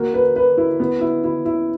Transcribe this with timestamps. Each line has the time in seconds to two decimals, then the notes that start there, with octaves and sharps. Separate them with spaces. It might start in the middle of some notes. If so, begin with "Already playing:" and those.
Already playing: A#3 F#4
0.14 B4
0.36 B4
0.58 E4
0.80 B3
1.01 E4
1.24 E4
1.45 E4